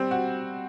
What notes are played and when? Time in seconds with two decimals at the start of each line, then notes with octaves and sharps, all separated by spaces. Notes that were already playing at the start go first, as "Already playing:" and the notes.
Already playing: G3 C4
0.11 F#4